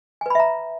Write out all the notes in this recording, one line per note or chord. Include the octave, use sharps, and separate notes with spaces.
B4 E5 G#5 A#5 B5